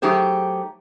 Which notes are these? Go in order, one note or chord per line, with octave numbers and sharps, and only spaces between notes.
F#3 A3 D#4 G4 G#4 C5